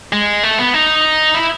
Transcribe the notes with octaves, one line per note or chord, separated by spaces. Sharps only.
G#3
A3
B3
D#4
E4